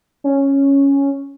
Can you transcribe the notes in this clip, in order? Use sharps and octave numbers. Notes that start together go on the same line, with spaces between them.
C#4